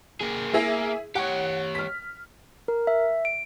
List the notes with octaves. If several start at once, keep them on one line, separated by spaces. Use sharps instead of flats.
A#3 G#4
A#3 E4 G#4 E5
G4 C#5 F#5
F6 B6
A#4
E5
D7